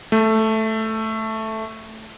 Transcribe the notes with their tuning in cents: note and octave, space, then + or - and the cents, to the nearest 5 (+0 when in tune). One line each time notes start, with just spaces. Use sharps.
A3 +0